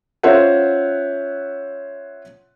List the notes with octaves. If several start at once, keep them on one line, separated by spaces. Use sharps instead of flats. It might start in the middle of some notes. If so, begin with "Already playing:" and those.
C#4 F4 C5 C#5 E5 F#5